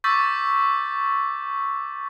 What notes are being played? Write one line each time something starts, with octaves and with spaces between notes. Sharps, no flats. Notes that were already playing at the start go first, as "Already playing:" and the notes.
C#6 D6 E6 G6 A6 B6